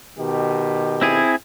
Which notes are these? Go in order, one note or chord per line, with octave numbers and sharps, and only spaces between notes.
B2 D#3 G4
C4 E4 G#4